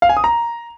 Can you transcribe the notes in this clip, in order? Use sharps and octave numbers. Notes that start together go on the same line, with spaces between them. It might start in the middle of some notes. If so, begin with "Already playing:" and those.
F5
G#5
D#6
A#5